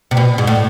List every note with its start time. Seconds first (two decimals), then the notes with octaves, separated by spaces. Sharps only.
0.11 C3
0.17 B2
0.38 G#2
0.47 A2